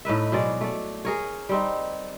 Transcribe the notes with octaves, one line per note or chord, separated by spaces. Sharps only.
A2 D#4 B4 E5
B2 F#3 G#3 D5
A3 D5
G#4 A#4 C#5
G3 C4 D#4